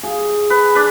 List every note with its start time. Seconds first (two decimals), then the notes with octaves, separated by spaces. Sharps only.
0.03 G#4
0.50 B4
0.75 D4 B4